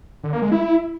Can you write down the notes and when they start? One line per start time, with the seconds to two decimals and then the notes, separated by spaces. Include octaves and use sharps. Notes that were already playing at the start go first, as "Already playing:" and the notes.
0.24 D3
0.33 A#3
0.42 G#3
0.52 E4